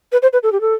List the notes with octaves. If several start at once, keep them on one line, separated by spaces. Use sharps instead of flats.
B4
C5
B4
A4
G4
A4